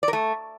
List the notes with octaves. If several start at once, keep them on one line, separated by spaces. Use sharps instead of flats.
D5
A#4
A3